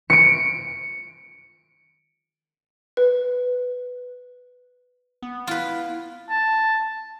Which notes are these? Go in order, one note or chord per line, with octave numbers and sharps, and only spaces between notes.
C#7 D7
B4
B3
E4 F4 B4
A5